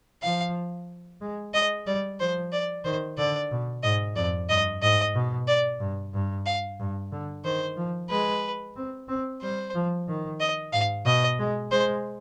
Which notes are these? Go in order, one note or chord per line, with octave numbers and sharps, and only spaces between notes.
F3 F5
G#3
G#3 D#5
G3 D5
F3 C5
D5
D#3 C5
D3 D5
B2
G#2 D#5
F2 D5
G2 D#5
G#2 D#5
B2
D5
G2
G2
F5
G2
D3
D#3 C5
F3
G#3 B4
C4
C4
G3 C5
F3
D#3
D#5
G#2 F5
B2 D#5
G#3
G#3 C5